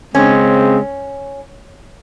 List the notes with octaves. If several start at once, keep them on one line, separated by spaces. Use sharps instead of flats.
C#3 G#3 C4 C#4